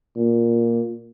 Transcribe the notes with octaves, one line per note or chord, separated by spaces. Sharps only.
A#2